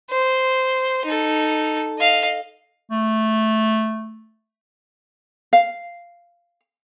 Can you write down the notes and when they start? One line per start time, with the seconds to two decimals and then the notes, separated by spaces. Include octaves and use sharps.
0.10 C5
1.05 D#4 A4
1.98 D#5 F5
2.91 A3
5.53 F5